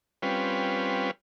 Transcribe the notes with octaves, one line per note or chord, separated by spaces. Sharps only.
G3 C4 C#4 F4 B4